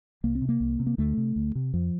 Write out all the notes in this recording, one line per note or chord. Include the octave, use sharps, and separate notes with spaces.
C2 A#3
C4
C3
A#3
C2
C3
A#3
D2 A3
C3
D2
C3
F2 F3